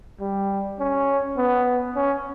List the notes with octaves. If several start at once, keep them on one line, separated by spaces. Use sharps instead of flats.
G3
C#4
B3
C#4